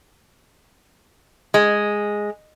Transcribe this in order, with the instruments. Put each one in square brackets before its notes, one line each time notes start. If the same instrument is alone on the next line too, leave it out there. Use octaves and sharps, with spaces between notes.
[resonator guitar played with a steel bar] G#3